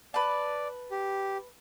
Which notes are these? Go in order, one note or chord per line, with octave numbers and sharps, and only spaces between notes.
B4 D5 A5
G4